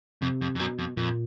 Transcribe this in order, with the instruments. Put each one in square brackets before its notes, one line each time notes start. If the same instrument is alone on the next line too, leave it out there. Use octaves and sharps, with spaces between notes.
[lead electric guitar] F2 [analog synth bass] C3
[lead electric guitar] F2
F2
[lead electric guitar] F#2 [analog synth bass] B2
[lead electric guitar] F2
[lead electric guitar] F2 [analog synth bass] A#2